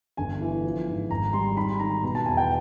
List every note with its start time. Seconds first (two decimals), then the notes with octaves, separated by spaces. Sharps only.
0.17 G1 G#5
0.41 E3
0.64 F3
0.88 G#2
1.10 G#1 A#5
1.33 G3 C6
1.57 G#2 B5
1.79 D#3 A#5
2.03 B2 A#5
2.15 A5
2.26 E2 G#5
2.37 G5